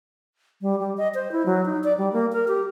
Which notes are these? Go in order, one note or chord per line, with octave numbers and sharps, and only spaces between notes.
G3
G3
D#5
C5
E4
F#3
D#4
D5
G3
A#3
A#4
G4